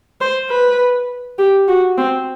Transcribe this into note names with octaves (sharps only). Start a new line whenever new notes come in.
C5
B4
G4
F#4
C4